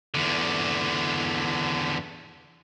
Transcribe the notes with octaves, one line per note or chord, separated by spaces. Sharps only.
E2 D3